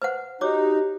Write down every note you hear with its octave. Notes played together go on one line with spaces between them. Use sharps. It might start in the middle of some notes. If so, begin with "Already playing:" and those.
B4 C5 F#5
D#4 F#4 G4 C#5 D6